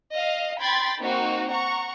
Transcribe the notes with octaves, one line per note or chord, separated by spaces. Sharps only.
D#5 F5
G5 B5 C6 G#6 A6
A#3 C4 D#4 F#4
F#5 A#5 C#6